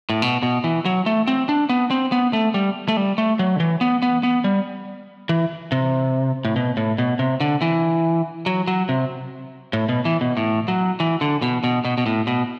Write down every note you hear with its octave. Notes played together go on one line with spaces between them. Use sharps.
A2
B2
B2
E3
F#3
A3
C4
D4
B3
C4
B3
A3
G3
A3
G3
A3
F#3
D3
E3
B3
B3
B3
G3
E3
C3
A2
B2
A2
B2
C3
D3
E3
F#3
F#3
C3
A2
B2
E3
B2
A2
F#3
E3
D3
B2
B2
B2
B2
A2
B2